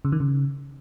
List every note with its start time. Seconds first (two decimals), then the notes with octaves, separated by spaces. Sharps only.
0.05 C#3
0.12 D#3
0.20 C#3